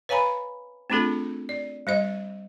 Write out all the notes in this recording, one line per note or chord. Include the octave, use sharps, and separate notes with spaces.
B4 C#5 F5 G#5 A#5 B5
A3 C4 D4 F4 G#4 A4
D5
G3 C5 D#5